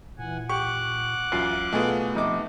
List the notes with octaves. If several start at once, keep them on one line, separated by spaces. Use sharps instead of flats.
A#2 E3 F#5 G#5
G4 F#5 C#6 D6 F#6
C#2 F#2 E3 F4 F5
B2 A3 B3 F4 G#4 D#5
C3 F3 D#4 D6